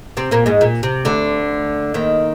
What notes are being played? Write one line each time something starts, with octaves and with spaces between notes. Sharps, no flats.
C3 C4
A#2 A#3
G#2 G#3
A#2
C3
D2 D3
D#2 D#3